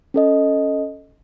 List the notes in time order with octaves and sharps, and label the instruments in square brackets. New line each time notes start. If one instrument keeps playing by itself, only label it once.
[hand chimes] C#4 A4 D#5